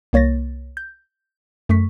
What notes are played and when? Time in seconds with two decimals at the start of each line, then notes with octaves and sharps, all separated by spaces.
0.13 C2 A#3 C#5 A6 A#6
0.77 G6
1.69 F#2 A3 C#6 B6